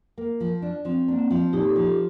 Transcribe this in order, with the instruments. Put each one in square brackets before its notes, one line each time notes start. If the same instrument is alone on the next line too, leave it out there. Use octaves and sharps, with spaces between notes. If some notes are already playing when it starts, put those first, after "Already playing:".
[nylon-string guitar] A#3
F3
D4
[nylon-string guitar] F3 [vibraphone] C4
[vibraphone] A#3 [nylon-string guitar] D4
[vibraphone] C4
[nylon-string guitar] F3
[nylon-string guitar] A#2 [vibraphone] D#4 G4
[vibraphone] A4
[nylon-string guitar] F3 [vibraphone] G4
[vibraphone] F4